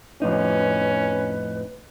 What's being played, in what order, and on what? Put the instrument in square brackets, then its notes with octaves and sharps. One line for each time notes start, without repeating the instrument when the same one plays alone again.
[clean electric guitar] F2 A2 D#4 [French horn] C#4 [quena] B4